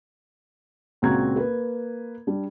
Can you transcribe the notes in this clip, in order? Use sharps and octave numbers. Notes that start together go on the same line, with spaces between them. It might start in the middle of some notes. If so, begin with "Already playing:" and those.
C#2 A#2 C4 F#4 A#5 G#6
A#3 B4
G3 D4